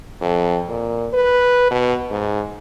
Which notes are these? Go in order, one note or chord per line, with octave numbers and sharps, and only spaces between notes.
F2
A#2
B4
B2
G#2